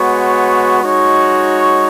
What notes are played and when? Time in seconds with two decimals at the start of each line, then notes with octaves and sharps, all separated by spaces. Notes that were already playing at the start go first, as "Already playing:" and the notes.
Already playing: G#3 B3 F#4 C#5
0.83 G#3 D#4 F#4 C#5